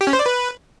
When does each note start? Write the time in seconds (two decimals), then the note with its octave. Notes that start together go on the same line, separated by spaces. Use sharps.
0.01 G4
0.07 C#4
0.13 C5
0.19 D5
0.26 B4